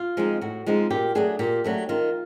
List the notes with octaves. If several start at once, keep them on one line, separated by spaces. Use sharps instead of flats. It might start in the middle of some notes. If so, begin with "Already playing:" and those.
Already playing: F4
F3 G#3 C4 D#4
A2 F#4
F3 G#3 C4 D#4
A#2 G4
F#3 A3 D4 G#4
A#2 G4
F#3 A3 D4
D#3 F4